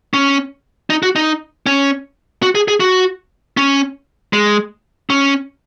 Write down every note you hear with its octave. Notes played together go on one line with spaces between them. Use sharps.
C#4
D#4
F#4
D#4
C#4
F#4
G#4
G#4
F#4
C#4
G#3
C#4